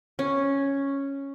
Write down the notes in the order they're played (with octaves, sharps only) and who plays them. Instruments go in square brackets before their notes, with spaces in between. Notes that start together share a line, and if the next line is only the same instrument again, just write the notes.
[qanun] C#4